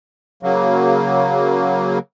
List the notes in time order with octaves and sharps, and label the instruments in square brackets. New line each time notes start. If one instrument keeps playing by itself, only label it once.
[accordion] C#3 F#3 A#3